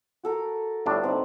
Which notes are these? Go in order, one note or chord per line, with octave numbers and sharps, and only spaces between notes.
F#4 A4 A#4
G1 A2 D4
C4 D#4 B5